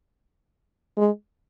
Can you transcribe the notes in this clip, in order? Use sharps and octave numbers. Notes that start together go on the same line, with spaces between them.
G#3